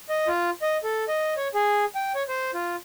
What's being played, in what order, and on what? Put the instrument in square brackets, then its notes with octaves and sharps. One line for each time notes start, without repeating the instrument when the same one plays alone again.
[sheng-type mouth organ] D#5
F4
D#5
A4
D#5
C#5
G#4
G5
C#5
C5
F4